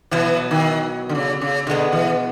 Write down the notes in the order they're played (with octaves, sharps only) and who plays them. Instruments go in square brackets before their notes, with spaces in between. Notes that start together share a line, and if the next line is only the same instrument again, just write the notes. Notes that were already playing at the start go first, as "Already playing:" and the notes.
[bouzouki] B2 F#3 B3 [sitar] E3
[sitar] D#3
D3
C#3
C#3
[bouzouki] B2 G#3 B3 [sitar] D3
[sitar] E3